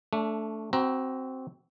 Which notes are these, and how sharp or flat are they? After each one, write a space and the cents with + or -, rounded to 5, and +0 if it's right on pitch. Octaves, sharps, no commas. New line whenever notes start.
A3 +0 D4 -25
C4 +0 F#4 +25 A#5 +15